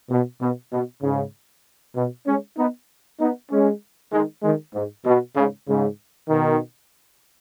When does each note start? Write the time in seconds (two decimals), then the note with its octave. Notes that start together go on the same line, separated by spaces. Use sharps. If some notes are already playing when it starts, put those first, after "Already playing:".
0.10 B2
0.41 B2
0.72 B2
1.03 G#2 C#3
1.96 B2
2.27 G#3 C#4
2.57 B3 D#4
3.20 B3 D#4
3.51 G#3 C#4
4.13 D#3 G#3
4.43 D#3 G#3
4.74 G#2
5.06 B2
5.36 G#2 C#3
5.67 G#2 C#3
6.29 B2 D#3